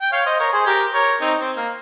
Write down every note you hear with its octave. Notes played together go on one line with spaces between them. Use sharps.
G5
C#5 F5
C5 D#5
A#4 C#5
G#4 C5
G4 A#4
A#4 C#5
C4 D#4
C4
A#3